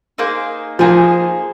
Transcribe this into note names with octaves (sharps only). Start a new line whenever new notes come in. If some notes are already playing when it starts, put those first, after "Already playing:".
A#3 D#4 G#4 C5
F3 A#3 D#4 G#4 C5